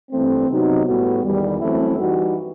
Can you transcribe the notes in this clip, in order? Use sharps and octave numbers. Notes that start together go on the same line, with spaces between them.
G2 E3 A3 C4
C3 F#3 B3 D#4 F#4
A2 G3 B3 F#4
E2 D#3 G3
F#2 E3 A3 C4 E4
E3 G3 D#4 F#4